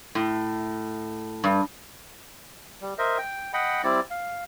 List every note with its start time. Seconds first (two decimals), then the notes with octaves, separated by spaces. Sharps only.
0.15 A2
1.44 G2
2.80 G3
2.98 A#4 C5 D#5 E5
3.18 G5
3.53 D#5 F#5 G5 B5
3.84 G3 C4 E4 D5
4.10 F5